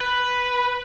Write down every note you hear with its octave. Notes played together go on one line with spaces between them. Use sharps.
B4